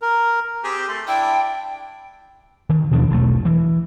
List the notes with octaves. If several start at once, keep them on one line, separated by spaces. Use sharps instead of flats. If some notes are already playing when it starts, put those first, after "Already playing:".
A#4
C4 G4 G#4
A3 C6
D4 E4 G5
D#3
D#2 B2 F3 D4
E1 B1 A3
E3